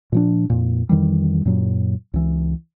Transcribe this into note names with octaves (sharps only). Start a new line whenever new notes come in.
A#2 F3 D4
F2 A#2
F2 D#3 E3 G3
F#2 A#2 F#3
C#2 E3